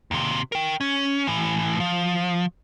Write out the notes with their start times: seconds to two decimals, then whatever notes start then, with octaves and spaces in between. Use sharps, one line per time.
0.11 D#2 C3
0.52 A#4 G5
0.81 C#4
1.27 A2 E3
1.80 F3